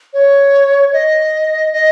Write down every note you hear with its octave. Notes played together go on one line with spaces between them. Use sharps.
C#5
D#5
D#5